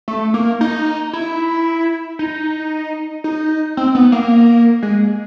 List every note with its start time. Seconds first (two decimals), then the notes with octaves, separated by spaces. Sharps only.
0.08 A3
0.34 A#3
0.61 D#4
1.13 E4
2.19 D#4
3.24 D#4
3.77 C4
3.95 B3
4.12 A#3
4.83 G#3